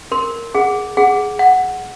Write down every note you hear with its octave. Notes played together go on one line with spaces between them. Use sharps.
A#4 C6
G#4 F#5
G#4 F#5
F#5